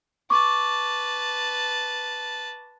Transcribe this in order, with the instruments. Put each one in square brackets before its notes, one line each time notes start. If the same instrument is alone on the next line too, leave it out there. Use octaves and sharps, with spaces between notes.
[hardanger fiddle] B4 A5 [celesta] C#6 D6